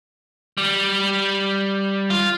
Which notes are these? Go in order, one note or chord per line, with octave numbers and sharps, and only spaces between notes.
G3
F4